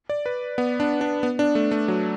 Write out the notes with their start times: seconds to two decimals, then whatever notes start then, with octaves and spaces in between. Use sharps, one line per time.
0.10 D5
0.26 B4
0.58 B3
0.80 D4
1.01 D4
1.23 B3
1.39 D4
1.55 A3
1.71 A3
1.88 F#3